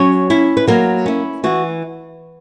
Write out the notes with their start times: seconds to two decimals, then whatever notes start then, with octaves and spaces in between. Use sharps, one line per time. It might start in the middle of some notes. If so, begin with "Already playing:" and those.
Already playing: F#3 C#4 C#5
0.30 C#4 E4
0.57 B4
0.67 F#3 A#3 A#4
1.06 C#4 E4
1.44 E3 F#4